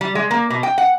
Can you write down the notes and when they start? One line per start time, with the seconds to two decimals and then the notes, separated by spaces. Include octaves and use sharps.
0.01 G3
0.15 G#3
0.31 A#3
0.50 B2
0.63 G5
0.78 F#5